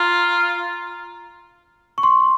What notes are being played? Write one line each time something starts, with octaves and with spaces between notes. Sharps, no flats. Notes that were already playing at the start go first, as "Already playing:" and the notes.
Already playing: F4 A#5
C#6
C6